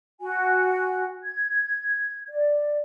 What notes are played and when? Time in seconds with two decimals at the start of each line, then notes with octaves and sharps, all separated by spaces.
0.21 F#4 G#5
1.24 G#6
2.30 D5